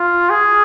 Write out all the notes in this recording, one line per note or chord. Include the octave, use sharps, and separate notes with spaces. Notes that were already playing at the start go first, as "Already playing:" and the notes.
Already playing: F4
G#4